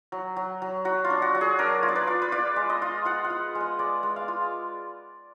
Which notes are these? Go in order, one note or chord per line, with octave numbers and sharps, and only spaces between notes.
F#3
F#3
F#3
F#3 F#4
F4
D4
F#4
F#3
G#4
D4 A#4
F4
D5
B4
F4
B4
F4 D5
G#3
D#5
F4
F4 F#5
F#5
F4
G#3
D#5
G#3 D5
G#3
F5
F4